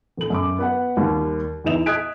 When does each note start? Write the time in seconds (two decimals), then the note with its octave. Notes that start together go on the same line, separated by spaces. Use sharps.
0.17 D#1 F#7
0.30 F#2 D6
0.58 B3 B4 F#5
0.97 D#2 G3
1.64 E2 E3 D#4 E5 E7 F7
1.86 D#5 D#6 F#6 G#6 B6 D7